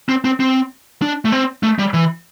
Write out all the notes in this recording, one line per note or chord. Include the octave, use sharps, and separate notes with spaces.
C4
C4
C4
D4
A3
C4
A3
G3
E3